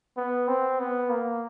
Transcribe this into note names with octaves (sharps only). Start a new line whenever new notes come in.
B3
C4
B3
A#3